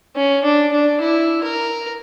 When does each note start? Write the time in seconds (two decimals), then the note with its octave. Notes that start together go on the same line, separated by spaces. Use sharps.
0.16 C#4
0.43 D4
0.72 D4
1.01 E4
1.43 A#4